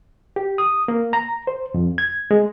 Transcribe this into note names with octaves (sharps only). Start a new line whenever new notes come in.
G4
D#6
A#3
A#5
C5
F2
G#6
G#3